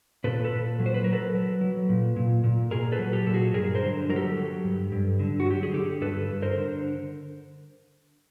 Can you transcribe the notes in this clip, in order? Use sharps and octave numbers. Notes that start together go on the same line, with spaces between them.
A#2 A4 B4
A4 B4
A#2
F#3
C5
B4
F#3 A#4
A4 B4
F#3
F#3
A#2
A#2
A#2
A#2 G#4 A#4
A4 B4
F#3
G4 A4
A#2 A4
F#4 G#4
G2 G#4 A#4
A#4 C5
D3
F#3 A#4
G4 A4
F#3
G2
G2
D3
F#4
F#3 G4
G#4
D3 G4 A4
G2 A4 B4
G2
A#4 C5
D3